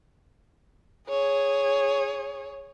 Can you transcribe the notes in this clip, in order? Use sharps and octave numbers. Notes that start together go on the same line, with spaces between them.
G#4 C#5